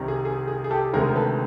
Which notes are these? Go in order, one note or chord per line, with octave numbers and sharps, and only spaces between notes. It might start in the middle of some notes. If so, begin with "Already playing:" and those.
Already playing: C2 C3 D#3 G3
G#4
G#4
G#4
G#4
G4 A4
D2 C3 D#3 G#3 G#4 A#4
A4 B4